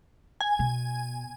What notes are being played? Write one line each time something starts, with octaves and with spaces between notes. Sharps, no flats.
G#5
B2